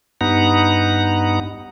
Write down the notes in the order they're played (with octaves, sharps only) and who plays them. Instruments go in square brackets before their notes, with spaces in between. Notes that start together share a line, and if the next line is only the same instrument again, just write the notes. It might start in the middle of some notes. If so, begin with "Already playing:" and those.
[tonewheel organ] G2 B3 D#4 F#5 A#5